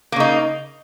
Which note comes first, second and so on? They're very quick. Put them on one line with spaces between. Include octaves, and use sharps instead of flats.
A#3 C#3 D#4